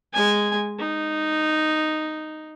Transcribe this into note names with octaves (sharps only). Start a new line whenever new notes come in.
G#3 G#5
D#4